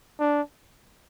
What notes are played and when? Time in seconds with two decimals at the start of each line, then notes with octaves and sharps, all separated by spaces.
0.19 D4